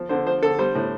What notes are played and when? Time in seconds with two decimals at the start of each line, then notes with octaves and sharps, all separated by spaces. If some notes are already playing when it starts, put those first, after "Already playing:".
Already playing: F3
0.09 D3 C5
0.26 F3 C5
0.42 D3 A4
0.59 G3 C5
0.75 A2